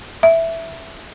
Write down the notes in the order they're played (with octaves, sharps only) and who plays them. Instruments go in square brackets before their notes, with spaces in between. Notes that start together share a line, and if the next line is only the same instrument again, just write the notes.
[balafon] E5